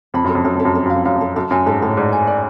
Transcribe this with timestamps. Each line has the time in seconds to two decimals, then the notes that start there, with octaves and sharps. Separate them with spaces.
0.14 F2 B5
0.24 F#2 A4
0.35 F2
0.44 F#2 A4
0.55 F2 A4
0.65 F#2
0.75 F2 A4
0.86 F#2 F5
0.95 F2
1.05 F#2 F5
1.15 F2
1.21 A4
1.36 F#2 A4
1.51 F#2 G#5
1.66 G#2 A4
1.82 A2 A4
1.97 G#2 D5
2.12 G#5
2.27 D5